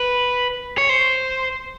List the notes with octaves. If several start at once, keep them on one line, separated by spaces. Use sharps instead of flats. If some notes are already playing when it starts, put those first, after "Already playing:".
Already playing: B4
C#5
C5